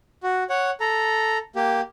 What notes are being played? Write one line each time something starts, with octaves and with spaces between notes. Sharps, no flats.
F#4
C#5 F#5
A4 A#5
A#3 G4